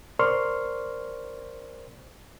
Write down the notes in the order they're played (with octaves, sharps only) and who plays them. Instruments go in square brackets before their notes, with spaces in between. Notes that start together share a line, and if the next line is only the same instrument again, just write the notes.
[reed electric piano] A#4 C5 D5 C6 C#6 F6